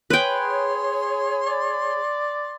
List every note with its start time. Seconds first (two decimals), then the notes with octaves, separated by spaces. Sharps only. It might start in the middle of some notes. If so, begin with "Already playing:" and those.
0.10 G#4 B4 C#5 G5 C6
1.47 D5